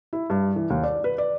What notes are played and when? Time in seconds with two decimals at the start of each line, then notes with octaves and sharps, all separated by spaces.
0.13 E4
0.30 G2
0.56 E3
0.70 D#2
0.83 D5
1.04 B4
1.18 D5